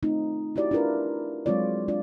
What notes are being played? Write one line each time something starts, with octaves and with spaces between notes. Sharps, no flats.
A3 C4 D#4 F4
E4 F#4 G4 D5
D4 E4 F4 A#4 B4
F#3 G#3 C4 F4 C#5 D5
G#3 D4 F4 D5